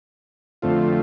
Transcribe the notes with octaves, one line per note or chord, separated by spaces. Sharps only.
F2 D3 A3 C4 F4